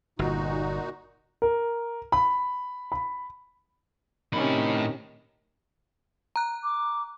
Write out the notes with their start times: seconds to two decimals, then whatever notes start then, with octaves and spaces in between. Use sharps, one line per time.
0.19 G1 A#2 D#4 F#4
1.42 A#4
2.12 B5
2.92 B5
4.33 A2 C3 D#3 C#4 B5
6.36 A#5 F#6
6.63 D6